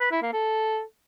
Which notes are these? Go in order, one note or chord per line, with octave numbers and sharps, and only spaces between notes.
B4
E4
A#3
A4